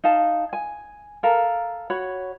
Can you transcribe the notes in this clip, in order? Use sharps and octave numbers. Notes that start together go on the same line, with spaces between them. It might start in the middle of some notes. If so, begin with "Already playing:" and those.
D#4 F5 A5
G#5
A4 A#4 F5 A#5
F#4 C#5 B5